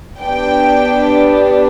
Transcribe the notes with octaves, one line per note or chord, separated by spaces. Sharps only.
B3 D4 G4 G5